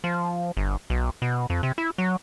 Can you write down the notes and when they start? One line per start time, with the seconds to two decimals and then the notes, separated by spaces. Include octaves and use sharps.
0.04 F3
0.57 G1
0.90 B1
1.22 B2
1.50 F2
1.63 C3
1.78 E4
1.98 F#3